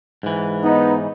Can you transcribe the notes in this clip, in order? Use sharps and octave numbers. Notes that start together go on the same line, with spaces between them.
G#2 E3
B3 D#4